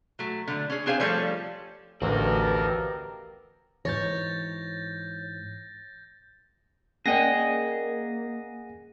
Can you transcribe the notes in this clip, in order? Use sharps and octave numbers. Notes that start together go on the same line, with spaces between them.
F#3 A3
D3 A3
C#4 G#4
C4 D4 G#4 C5 F5 G#5
F3 G3 A3 A4 C#5
A1 D2 B2 C4 F4 G4 A#4
G#2 E3 C#5 G6 A6 A#6
A#3 C#4 G#4 D5 D#5 F#5 A#6